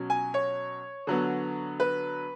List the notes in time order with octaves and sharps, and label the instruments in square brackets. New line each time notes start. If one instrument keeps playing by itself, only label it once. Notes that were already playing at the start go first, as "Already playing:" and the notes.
Already playing: [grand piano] B2 F#3 C#4
G#5
C#5
D3 F#3 B3
B4